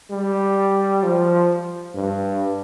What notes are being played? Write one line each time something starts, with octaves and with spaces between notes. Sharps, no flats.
G3
F3
G2